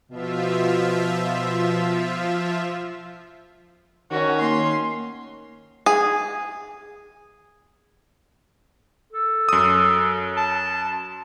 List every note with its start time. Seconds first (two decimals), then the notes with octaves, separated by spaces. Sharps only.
0.10 B2 F3 F4 E5
4.11 D#3 C#4 F#4
4.40 A#3 C6
5.86 G#4
9.13 A4
9.49 F#2 D#6
10.37 A5